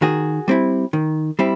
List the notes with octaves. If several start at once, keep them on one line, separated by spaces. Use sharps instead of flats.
D#3 F#4 G#4
G3 C4 E4
D#3
G3 C4 E4